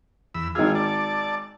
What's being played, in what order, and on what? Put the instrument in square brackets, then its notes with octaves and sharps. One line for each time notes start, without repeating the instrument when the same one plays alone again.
[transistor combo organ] E2 B5 E6
[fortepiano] G#1 E6 [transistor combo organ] F4 G#4
[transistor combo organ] D5 A5